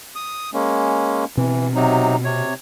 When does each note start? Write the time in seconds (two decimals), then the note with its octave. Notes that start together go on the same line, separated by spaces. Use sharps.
0.16 D#6
0.54 G#3 A#3 C#4
1.37 B2 E3 C4
1.75 C3 F#3 D#4
2.24 C3 C#5